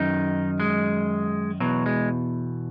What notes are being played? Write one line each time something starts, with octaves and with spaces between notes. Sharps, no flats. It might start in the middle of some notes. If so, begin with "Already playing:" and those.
Already playing: F#2 D#3 D#4
G#3
E2 B2 F#3
G#3